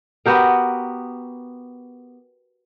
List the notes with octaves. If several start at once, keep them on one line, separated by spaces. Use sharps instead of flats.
B3 F#4 G4 A#4